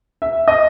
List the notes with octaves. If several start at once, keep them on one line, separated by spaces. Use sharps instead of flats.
E5
D#5